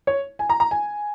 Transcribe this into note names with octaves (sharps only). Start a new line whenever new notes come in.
C#5
G#5
A#5
A#5
G#5